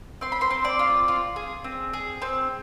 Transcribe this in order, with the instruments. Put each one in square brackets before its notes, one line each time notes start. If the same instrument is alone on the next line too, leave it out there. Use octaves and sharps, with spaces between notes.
[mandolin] C4 C6
B5
C5 C6
C4
D5 D6
F4
F4
G#4
C4
G#4
C4